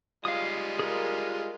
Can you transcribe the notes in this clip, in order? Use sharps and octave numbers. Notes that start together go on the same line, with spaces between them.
G3 G#3 F4 F5 D#6
G#4 A#4